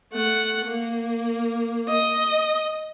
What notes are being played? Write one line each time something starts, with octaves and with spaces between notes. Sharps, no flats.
A3 F#5
A#3
D#5